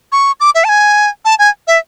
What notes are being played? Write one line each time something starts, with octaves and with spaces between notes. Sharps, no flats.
C#6
D6
E5
A5
G#5
A5
G#5
E5